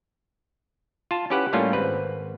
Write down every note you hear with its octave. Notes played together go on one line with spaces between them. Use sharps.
F4 A5
C#4 E4 G4 B4 F#5
A2 G3 A3 A#3 C#4 F4
G#1 C4 B4